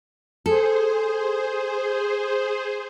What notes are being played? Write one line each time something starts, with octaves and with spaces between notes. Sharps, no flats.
G#4 A4 C5